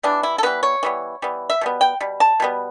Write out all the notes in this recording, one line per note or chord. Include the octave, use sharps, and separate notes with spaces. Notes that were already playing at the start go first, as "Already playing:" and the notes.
E3 G3 B3 D4
E4
A4
E3 G3 B3 B4
C#5
E3 G3 B3
E3 G3 B3
E5
B2 G3 B3
G5
B2 G3
A5
B2 G3 B3